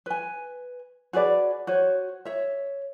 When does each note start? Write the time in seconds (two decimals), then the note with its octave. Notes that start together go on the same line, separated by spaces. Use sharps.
0.06 B4 G#5
1.13 F#4 G#4 B4 D5
1.67 F#4 C5 C#5
2.25 C#5 E5